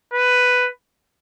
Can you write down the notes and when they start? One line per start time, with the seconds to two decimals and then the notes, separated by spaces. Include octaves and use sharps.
0.14 B4